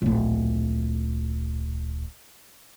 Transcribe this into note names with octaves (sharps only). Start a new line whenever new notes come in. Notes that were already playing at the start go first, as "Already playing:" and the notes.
D1 A#1